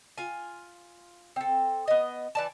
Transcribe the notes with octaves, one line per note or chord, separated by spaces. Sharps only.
F4 G#5
C4 A4
B3 D#5
E3 D5 A5